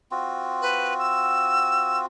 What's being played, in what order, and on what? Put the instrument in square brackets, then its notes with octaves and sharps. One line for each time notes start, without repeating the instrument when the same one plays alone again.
[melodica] C4 F4 F#4
[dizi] B4
E6